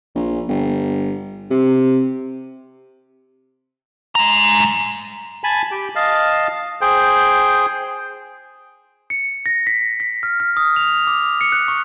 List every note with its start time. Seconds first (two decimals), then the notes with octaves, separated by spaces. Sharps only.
0.15 A#1
0.49 G1
1.50 C3
4.15 G#3 A#5
5.44 G#5 A5 B5
5.71 G4 G5
5.95 D#5 F5 A5
6.81 G#4 C5 G5
9.10 C#7
9.46 A#6
9.67 B6
10.00 B6
10.23 F6
10.40 F6
10.57 D#6
10.76 F7
11.07 D6
11.41 C#7
11.52 F#6
11.68 C#6